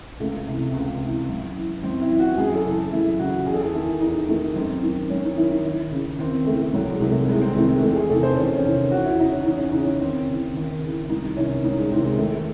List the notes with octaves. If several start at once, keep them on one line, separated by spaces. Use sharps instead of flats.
C#2 A3
C3 E3
C#2
C3 E3
F#2
E3
F#2 C4
E4
E3
F#4
F#2 G#4
A4
C#3 E3
F#2 E4
C#3 E3 F#4
E2 G#4
A4
G#4
D#3 E4
E2 D#4
D#3 A3
F#2 C4
D#3
F#2 C#4
D#4
D#3 E4
D#4
D#2 E4
C#3 E3
D#2 C4
C#3 E3 A3
C2 F#3
G#3
C3 D#3
A3
C2 G#3
C4
C3 D#3 A3
G#3
E2 A3
G#4
C3 D#3 A4
C5
E2 C#4
C#4
C3 D#3
E2 F#4
E4
C#3 E3 D#4
C#4
E2 D#4
C#4
C#3 E3 D#4
C#4
D#2 C4
C#3 E3
D#2
C#3 E3
C2 D#4
C3 D#3 C#4
C2 D#4
G#3
C3 D#3 C4
G#3
D#2 A3